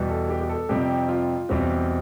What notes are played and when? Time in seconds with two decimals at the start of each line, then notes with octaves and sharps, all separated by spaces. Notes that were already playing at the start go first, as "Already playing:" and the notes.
Already playing: E2 B2 G3 B3
0.09 A4
0.29 G4
0.41 G4
0.49 A4
0.69 F2 C3 G3 G4
1.08 F4
1.49 E2 B2 G3 C4 G4